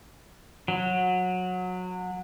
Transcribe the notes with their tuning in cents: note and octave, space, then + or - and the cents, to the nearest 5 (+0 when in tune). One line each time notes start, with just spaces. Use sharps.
F#3 -20